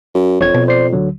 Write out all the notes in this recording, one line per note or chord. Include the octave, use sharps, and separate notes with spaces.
F#2
E1 F2 C#5 G#6
B2
C5 D5 C7
D2 D3 F#3